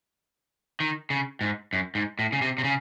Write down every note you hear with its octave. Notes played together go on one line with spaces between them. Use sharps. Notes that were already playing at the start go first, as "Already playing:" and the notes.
D#3
C#3
G#2
F#2
G#2
A2
C#3
C3
C3
C#3